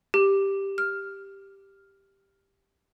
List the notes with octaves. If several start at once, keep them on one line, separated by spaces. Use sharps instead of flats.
G4
F6